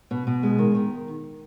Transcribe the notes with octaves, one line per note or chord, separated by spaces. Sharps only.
B2
B2
G#3
D#3
D#3